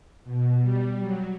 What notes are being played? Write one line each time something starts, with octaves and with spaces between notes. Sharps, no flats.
B2
G3
F#3